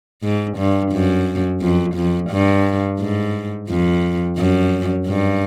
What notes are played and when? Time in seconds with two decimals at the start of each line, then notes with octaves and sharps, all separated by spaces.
0.23 G#2
0.58 G2
0.92 F#2
1.61 F2
1.95 F2
2.30 G2
2.99 G#2
3.69 F2
4.38 F#2
5.07 G2